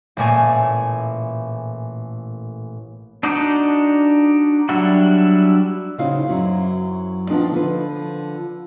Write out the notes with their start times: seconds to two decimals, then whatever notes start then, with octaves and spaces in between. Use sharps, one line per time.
0.17 A1 A#2 A3 G#5
3.23 D4 D#4 F#4 D6 G6
4.69 F#3 G3 D4 E4 F#4
5.98 C#3 C4 D#4 E4 F#4 F5
6.28 F#2 F#3 C4 E4
7.30 F3 B3 C4 D4 D#4
7.51 D3 F3 B4